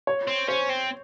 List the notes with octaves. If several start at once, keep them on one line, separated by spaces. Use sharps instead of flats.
C#5
C4
C#4 C5
C4